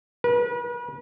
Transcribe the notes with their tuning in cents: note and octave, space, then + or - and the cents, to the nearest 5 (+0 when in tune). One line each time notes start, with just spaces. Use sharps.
B4 -40